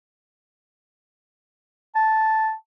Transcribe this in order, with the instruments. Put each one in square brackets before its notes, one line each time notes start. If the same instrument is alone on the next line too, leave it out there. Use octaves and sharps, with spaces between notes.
[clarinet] A5